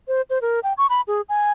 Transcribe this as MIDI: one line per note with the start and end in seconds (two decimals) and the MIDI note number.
0.08 0.22 72
0.30 0.41 72
0.42 0.60 70
0.64 0.73 79
0.78 0.87 85
0.90 1.01 83
1.07 1.21 68
1.29 1.52 80